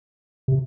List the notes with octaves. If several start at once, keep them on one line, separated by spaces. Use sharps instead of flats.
C3